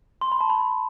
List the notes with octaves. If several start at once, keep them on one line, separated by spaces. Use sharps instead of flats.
C6
B5
A5
B5